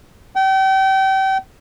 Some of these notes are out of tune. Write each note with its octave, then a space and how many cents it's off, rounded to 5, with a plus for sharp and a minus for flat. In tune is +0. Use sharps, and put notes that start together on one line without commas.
G5 -35